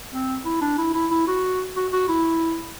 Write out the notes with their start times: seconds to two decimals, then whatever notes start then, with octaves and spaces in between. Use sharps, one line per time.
0.12 C4
0.45 E4
0.61 D4
0.78 E4
0.94 E4
1.11 E4
1.27 F#4
1.76 F#4
1.92 F#4
2.09 E4